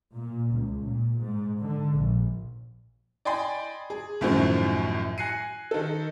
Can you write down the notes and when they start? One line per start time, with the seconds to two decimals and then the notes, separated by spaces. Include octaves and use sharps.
0.16 A#2
0.53 C#2
0.84 A#2
1.20 G#2
1.60 D3
1.96 A#1
3.25 D5 D#5 G5 G#5 B5 C6
3.90 G#4
4.21 C2 F#2 A2 D#3 F3 F#3
5.18 G#5 F#6 A#6 C7 C#7 D#7
5.71 D#3 A4